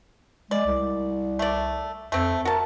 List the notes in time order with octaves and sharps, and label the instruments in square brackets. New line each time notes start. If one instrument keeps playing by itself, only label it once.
[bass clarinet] G#3 [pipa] D5
[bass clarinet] C2
[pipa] A3 D5
[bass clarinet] F2 [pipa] A3 C4
[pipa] F#4 A5 [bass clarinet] A#4